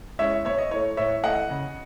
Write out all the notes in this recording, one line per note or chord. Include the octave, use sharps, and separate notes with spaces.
G#3 C#4 E4 C#5 E5
B2 C#5 E5
D#5
A3 E4 C#5
A2 C#5 E5
E3 A3 E4 D#5 F#5
C#3